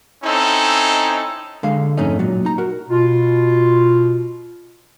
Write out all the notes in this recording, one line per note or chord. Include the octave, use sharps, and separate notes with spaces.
C4 C#4 D#4 E4 A4
D3 G#3 F5
F2 G#2 A3 C#4 D#4
A#2 F#3
D#4 A#5
F#4 A#4
B2 F4